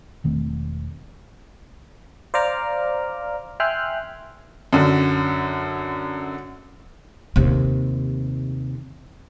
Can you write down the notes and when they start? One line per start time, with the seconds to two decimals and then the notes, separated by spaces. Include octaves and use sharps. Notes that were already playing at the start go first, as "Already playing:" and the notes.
0.24 E1 D#3 A3 C4
2.34 C5 D5 F5 A#5 D6 F6
3.60 E5 G5 G#5 C6 F6 F#6
4.73 F#2 D3
7.36 D#2 C3